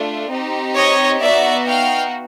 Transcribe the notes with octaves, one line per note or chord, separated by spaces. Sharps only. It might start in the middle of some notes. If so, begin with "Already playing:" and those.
Already playing: A3 D4 F4
C4 D#4 G4
C#5 D#5
B3 D#4 F#4 D5 E5
F5 G5